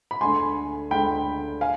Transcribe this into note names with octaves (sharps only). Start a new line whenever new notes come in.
B5
D2 D3 G#3 G#5 C6
D2 D3 G#3 G5 B5
F5 G#5